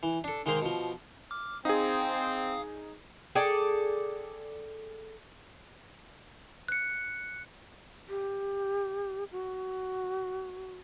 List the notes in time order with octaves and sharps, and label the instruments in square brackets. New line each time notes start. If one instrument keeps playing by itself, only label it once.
[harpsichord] E3
D4 A4
D#3 G#3 A#3 A#4 C5
B2 F3
[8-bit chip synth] D6 F6
[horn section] C4 [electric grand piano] D#4 G#4 [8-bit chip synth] F5 D#6
[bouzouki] G#4 A4 D5 G5
[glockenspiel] F#6 C#7
[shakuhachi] G4
F#4